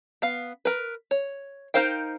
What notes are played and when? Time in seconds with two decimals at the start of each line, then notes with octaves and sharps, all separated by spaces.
0.22 B3 F5
0.65 A#4 B4
1.11 C#5
1.74 D#4 A#4 C5 F5 G5